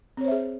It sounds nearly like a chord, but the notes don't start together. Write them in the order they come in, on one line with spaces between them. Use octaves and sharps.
C4 C#5 C5 E5 G#4